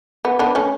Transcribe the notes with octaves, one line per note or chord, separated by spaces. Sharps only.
B3
B3 D4
A3 C#4